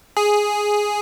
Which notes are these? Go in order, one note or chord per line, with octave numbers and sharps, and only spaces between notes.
G#4